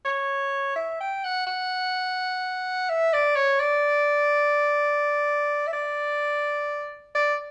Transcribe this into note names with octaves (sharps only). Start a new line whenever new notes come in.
C#5
E5
G5
F#5
F#5
E5
D5
C#5
D5
E5
D5
D5